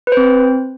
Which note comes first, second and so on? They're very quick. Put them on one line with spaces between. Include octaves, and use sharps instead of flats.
B4 C5 C4